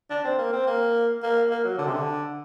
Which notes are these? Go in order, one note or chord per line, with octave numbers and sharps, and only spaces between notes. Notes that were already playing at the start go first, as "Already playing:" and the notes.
D4
C4
A#3
C4
A#3
A#3
A#3
F#3
D3
C3
D3